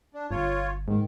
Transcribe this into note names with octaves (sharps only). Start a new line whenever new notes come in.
D4
G1 F4 C#5
G#2 D#3